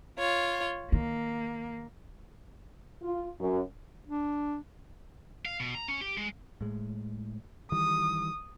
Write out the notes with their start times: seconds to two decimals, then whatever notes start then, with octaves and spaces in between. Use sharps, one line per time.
0.18 F4 C#5
0.92 D#3 A#3
3.03 F4
3.40 F#2
4.07 D4
5.46 F5
5.60 B2
5.75 A#5
5.88 C#4
6.01 G4
6.18 G#3
6.61 A2 G#3
7.72 D#3 E3 G3 D#6